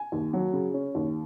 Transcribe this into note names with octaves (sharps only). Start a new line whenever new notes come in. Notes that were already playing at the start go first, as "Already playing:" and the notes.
Already playing: G#5
D#2
F#3
C#3
C#4
D#2